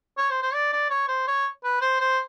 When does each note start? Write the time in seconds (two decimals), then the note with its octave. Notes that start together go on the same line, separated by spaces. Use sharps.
0.18 C#5
0.30 C5
0.42 C5
0.54 D5
0.73 D5
0.90 C#5
1.08 C5
1.27 C#5
1.64 B4
1.81 C5
2.00 C5